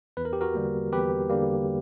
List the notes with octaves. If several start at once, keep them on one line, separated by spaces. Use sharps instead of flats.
E2 B4
A#4
G4
F#4 A#4
D3 G3 A#3
E2 G4 B4
D3 G3 A#3